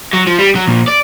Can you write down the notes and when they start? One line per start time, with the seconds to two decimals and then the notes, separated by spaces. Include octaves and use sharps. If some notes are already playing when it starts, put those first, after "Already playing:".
0.13 F#3
0.27 F3
0.39 G3
0.55 F#3
0.67 A#2 F3
0.88 D5